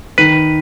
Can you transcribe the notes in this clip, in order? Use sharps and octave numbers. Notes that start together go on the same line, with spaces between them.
D#3 B4